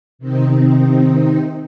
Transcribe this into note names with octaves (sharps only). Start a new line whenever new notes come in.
C3 D#3 C4 D#4